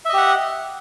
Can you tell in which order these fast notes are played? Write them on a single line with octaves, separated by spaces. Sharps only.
E5 D#5 G4 F#5